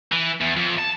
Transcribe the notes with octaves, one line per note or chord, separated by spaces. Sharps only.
E3
E2
F2
A5